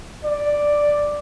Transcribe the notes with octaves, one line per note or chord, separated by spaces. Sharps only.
D5